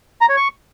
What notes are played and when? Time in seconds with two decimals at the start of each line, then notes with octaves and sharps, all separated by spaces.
0.21 A#5
0.29 C#5
0.37 C#6